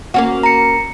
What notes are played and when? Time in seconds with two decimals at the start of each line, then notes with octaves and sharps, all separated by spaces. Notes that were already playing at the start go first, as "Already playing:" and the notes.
0.14 A#3 C#4 F#4
0.43 A#5 C#7